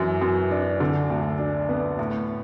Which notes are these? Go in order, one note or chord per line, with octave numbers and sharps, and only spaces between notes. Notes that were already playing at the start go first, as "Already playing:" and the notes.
Already playing: F#2 E3
F#2
D4
D3
D2
D4
B3
A2